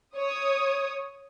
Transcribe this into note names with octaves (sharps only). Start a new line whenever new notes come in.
C#5 D#6